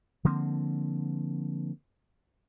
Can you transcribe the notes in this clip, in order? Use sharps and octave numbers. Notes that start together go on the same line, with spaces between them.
D3 F3 A#3 C4